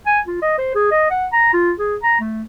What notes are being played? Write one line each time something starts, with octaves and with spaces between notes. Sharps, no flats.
G#5
F4
D#5
C5
G#4
D#5
F#5
A#5
F4
G#4
A#5
A3